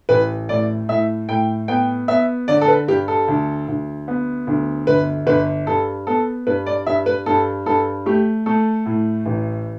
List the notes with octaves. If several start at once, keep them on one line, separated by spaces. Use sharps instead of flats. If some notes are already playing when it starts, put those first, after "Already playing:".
A1 B4
A2 D5
A2 E5
A2 G5
B3 G5
B3 E5
D3 D5
A4
B4
G2 G4
A4
D2
D2
B3
D2
G1 B4
G1 B4
G2 A4
B3 A4
G2 B4
D5
G2 E5
B4
G2 A4
G2 A4
A3 G4
A3 A4
A2
A1